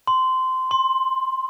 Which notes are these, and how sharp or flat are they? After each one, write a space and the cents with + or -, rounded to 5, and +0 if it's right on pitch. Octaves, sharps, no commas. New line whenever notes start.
C6 -15
C6 +15